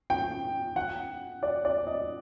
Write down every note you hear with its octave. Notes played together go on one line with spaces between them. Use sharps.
G5
F#5
D5
D5
D#5